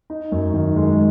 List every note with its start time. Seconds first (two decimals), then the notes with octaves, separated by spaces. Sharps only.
0.10 D#4
0.32 F#2
0.54 D#3
0.76 G#3